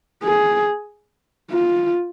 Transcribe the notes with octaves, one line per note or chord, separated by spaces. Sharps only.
G#4
F4